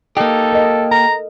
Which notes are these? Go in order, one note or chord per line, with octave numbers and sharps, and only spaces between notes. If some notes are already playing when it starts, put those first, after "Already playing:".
A#3 D#4 G4 A4
A#4 D#5
A4 A#5